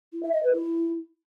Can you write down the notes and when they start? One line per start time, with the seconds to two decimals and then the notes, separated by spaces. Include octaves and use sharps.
0.13 E4
0.23 E5
0.33 D#5
0.43 B4
0.53 E4